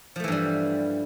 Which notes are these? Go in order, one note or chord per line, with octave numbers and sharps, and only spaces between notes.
G2 E3 F3 G3 A3